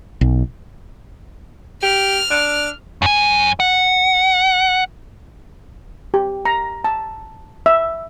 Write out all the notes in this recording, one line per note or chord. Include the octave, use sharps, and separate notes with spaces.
B1
G4 F6
D4
F#2 G#5
F#5
G4
A#5
A5
E5